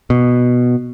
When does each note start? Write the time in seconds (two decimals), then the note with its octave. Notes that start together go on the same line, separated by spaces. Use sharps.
0.10 B2